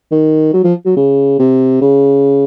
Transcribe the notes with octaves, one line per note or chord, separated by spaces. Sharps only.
D#3
F#3
F3
F#3
C#3
C3
C#3